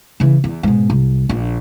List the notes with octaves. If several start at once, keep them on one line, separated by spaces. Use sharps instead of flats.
C#3 E3
E2
G#2 B2
C2
A#1